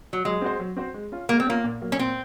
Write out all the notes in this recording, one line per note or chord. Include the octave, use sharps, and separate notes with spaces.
F#3
F#3 G#3
C4 F#4 C5
F#3
C4 F#4 C5
G#3
C#4 F4
G#3 A#3
C4
A#3 C#4 F4
A#2
F#3 A#3
C#4
A#2 C4